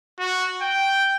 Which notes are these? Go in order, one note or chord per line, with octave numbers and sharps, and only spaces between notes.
F#4
G5